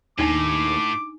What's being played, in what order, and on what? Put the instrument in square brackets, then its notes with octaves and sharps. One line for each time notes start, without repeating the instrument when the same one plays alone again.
[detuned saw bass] D#2 [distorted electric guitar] A2 [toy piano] D4 D#4 G#5 [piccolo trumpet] D6